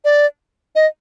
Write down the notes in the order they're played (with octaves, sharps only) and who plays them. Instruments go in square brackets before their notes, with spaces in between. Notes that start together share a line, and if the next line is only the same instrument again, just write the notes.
[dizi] D5
D#5